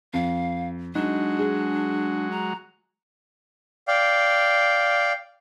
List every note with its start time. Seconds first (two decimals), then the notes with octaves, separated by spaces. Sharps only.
0.13 F2 F5
0.95 F#3 G#3 D4 D#4 F#4
1.39 G#4
2.31 A#5
3.88 D5 F5 G5